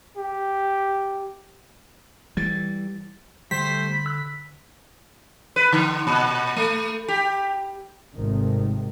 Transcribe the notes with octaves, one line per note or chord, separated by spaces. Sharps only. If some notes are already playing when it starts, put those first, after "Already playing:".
G4
E3 G3 A6
D3 G3 A3 C5 B6
B5
E6 F#6
B4
D3
A#2
A3
G4
G#1 C3 D#3 A3 C4